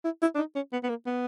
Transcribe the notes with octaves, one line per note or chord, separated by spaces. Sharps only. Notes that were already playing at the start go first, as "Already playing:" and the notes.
E4
E4
D4
D#4
C#4
B3
B3
A#3
B3